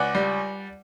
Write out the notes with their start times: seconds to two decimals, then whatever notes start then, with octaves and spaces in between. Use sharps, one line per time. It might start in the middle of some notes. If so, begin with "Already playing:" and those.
Already playing: C#2 D5 F#5
0.15 G3